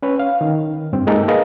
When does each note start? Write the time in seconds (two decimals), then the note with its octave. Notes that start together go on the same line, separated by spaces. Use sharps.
0.02 C#4 B4 C#5
0.19 F5
0.41 D#3
0.93 G2 C4
1.07 G#3 A#3 D#4 G4 A4 A#4
1.28 G#4 A#4 B4 D#5 F5 A#5